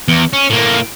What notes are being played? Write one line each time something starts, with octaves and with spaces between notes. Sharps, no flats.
E2
C#4
A2 A#3